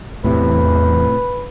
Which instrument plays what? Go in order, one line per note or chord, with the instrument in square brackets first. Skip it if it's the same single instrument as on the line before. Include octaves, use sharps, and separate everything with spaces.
[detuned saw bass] E2 [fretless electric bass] A2 C3 [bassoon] B4